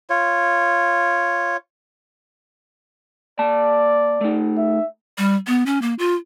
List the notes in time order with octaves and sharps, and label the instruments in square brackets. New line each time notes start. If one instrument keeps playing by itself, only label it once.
[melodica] F4 C#5
[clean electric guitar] A#3 A5 [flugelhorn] D5
[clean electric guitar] A3 D#4
[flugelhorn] E5
[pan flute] G3
B3
C#4
A#3
F4